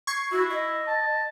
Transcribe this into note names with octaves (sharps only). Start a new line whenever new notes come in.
C#6 G#6 C7
E4 F#4
D#5
A5